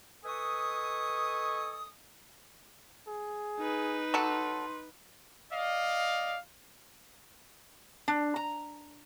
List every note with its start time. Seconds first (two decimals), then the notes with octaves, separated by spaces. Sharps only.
0.24 A4 B4 D#5 G#5 C#6 D#6
3.08 G#4
3.59 D#4 B4
4.14 F#3 A4 C6
5.52 D5 D#5 F5
8.08 D4
8.36 A#5